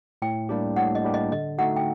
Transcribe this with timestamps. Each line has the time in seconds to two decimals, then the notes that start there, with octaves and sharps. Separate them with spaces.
0.22 A2 G5
0.49 G3 A#3 D4 G4
0.76 A2 F#5
0.95 D#5
1.04 G3 A#3 D4 G4
1.14 D#5
1.32 D3 D#5
1.58 A3 D#4 F#4 F#5
1.76 G5